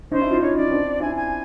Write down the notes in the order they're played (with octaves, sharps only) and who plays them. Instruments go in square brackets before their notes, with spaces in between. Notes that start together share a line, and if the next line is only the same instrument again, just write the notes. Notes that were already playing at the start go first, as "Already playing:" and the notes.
[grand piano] C#4 D#4 [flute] C5
[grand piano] D4 E4
D#4 F4
[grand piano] D4 E4 [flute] C#5
[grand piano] C#4 D#4 [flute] D5
[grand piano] C4 D4
[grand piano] D4 E4 [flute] G#5
[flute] G#5